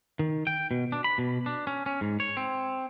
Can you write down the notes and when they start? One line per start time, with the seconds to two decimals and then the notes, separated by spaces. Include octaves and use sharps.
0.19 D#3
0.47 G5
0.71 B2
0.92 D4
1.04 B5
1.18 B2
1.46 D4
1.67 C#4
1.86 C#4
2.01 G#2
2.20 C#5
2.37 C4